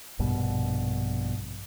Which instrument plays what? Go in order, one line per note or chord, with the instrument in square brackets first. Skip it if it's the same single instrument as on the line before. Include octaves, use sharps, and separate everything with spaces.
[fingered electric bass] A#1 G2 B2